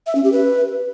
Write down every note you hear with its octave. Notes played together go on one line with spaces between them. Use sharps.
E5
C#4
G4
B4